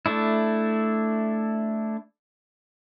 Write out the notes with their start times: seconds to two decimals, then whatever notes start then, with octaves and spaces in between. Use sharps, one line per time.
0.06 A3 D4 E4